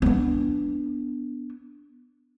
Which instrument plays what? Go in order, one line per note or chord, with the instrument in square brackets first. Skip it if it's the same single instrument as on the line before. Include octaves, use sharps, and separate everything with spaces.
[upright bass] B3 D4